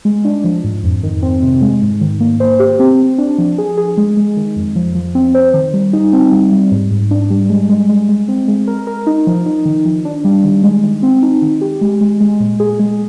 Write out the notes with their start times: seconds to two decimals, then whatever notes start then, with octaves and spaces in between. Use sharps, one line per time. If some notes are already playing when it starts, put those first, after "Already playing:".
0.05 G#3
0.25 D4
0.44 F3
0.64 G#2
0.84 F2
1.03 D#3
1.22 C4
1.42 C3
1.62 G#3
1.82 G#2
2.01 D#3
2.20 A#3
2.40 C5
2.60 G4
2.80 C4
2.99 C4
3.18 D4
3.38 F3
3.58 G#4
3.78 G#4
3.97 G#3
4.17 G#3
4.37 D#3
4.56 F2
4.76 F3
4.95 F3
5.15 C4
5.34 C5
5.54 D#3
5.73 G3
5.93 D#4
6.13 C4
6.32 G3
6.52 G3
6.71 G#2
6.91 G#2
7.11 D4
7.30 G3
7.50 G#3
7.69 G#3
7.90 G#3
8.09 G#3
8.28 C4
8.48 G#3
8.67 A#4
8.87 A#4
9.07 D#4
9.27 F3
9.46 D#4
9.65 D#3
9.85 F3
10.05 D4
10.25 G3
10.44 D#3
10.63 G#3
10.83 D#3
11.03 C4
11.23 D#4
11.42 D#3
11.61 G4
11.81 G#3
12.01 G#3
12.21 G#3
12.40 A#2
12.60 G#4
12.79 G#3